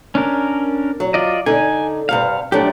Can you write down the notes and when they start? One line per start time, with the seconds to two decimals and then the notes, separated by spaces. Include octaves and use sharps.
0.15 C#4 D4 A#4
1.00 F#3
1.14 F4 D5 D#5
1.46 D3 D#4 G#5
2.09 G2 C3 F5 F#5
2.52 F3 F#3 A3 D4 G4